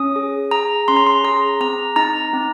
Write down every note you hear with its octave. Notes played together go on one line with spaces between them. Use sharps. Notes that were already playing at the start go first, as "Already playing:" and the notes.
Already playing: C#4 D#6
G#4
G#4 A#5
C#4 C6
A#5
C6
G#4 A#5
C4 A#5
D#4 A#5
C4